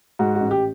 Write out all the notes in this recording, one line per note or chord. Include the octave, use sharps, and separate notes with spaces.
G#2 F#4
F#4
A1
G4